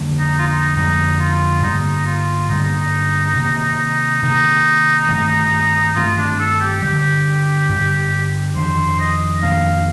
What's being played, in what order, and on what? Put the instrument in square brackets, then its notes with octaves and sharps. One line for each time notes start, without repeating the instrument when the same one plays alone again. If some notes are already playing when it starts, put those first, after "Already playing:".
Already playing: [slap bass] F2 D3 G3 A#3
[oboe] D#4
F4
D#4
[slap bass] F2 D3 G3 A#3 [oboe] D#4
[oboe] F4
[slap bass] G2 D3 G3 A#3 [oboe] D#4
[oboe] F4
[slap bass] G2 D3 G3 A#3 [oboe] D#4
[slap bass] C3 D#3 A#3
[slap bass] C3 D#3 A#3 [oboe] D#4
[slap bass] G2 D#3 A3 C4
[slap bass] G2 D#3 A3 C4 [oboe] F4
[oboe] D4
A4
G4
[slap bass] G2 D3 G3 [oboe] G4
[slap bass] G2 D3 G3
[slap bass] F2 D#3 A#3 D4 [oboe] C5
[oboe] D#5
[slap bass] F2 D#3 A#3 D4 [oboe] F5